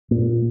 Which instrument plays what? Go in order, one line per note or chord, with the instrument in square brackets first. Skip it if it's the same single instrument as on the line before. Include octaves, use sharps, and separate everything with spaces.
[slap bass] A#2